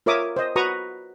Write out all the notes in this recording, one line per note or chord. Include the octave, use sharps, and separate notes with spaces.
F4 A#4 C#5 E5 D6 D#6
C5 D#5
F#4 B4 A#5 C#6 D#6